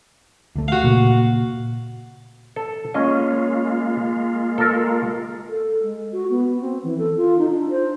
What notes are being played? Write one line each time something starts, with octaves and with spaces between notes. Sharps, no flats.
D2 A3
F#4 F5
A#2 C#3 A#3
A4
G#3 A#3 C#4 F4 D#5
A4 A#4
A4
G#3
F#4
B3
C4
E3
A4
F4
D#4
D4
C5